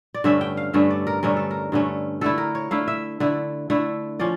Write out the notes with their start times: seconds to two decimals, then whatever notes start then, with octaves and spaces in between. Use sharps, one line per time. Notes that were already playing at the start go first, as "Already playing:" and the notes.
0.14 D5
0.24 G2 D3 A3 C#4 E5
0.41 G5
0.57 F5
0.73 G2 D3 A3 C#4 E5
0.90 D5
1.07 A#4
1.23 G2 D3 A3 C#4 A#4
1.37 A4
1.51 A#4
1.72 G2 D3 A3 C#4
2.21 D3 A3 E4 A4
2.38 A#4
2.55 C#5
2.71 D3 A3 E4 F5
2.88 E5
3.20 D3 A3 E4
3.70 D3 A3 E4
4.19 F3 C#4 D5